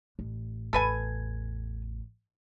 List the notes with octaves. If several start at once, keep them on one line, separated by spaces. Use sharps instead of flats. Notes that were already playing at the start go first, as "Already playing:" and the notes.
A1
A1 E2 A4 B4 G#5